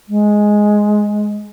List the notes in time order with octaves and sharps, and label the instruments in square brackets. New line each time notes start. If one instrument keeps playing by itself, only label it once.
[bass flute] G#3